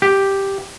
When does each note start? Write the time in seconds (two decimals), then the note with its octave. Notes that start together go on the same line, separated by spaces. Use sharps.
0.02 G4